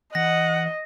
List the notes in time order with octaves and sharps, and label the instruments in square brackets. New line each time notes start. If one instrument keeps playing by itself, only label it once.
[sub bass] E3 [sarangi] D#5 [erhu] F#5 [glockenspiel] A#6